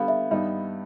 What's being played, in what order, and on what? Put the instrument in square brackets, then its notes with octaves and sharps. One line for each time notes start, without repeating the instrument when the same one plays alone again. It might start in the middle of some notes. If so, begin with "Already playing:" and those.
Already playing: [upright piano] D3 G3 B3 [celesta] F5
[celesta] E5
[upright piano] G2 D#3 G3 B3 D#4